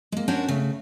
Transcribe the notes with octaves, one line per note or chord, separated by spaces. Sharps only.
G#3 A#3
C#4 D4 F#4 A#4 C5 C#5
C#3 A3